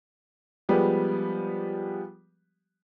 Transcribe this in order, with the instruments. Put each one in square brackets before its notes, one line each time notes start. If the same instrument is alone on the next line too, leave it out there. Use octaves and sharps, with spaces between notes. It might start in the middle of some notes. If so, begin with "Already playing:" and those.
[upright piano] F3 G3 G#3 B3 G4